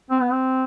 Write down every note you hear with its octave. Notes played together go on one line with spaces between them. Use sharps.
C4
B3
C4